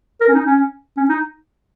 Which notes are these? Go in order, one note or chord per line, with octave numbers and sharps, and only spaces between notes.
A#4
C#4
D#4
C#4
C#4
D#4